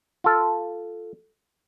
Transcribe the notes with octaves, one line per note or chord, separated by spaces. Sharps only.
F4 A4